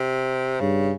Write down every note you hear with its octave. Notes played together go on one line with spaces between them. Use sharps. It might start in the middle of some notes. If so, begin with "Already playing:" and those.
Already playing: C3
G2 C#3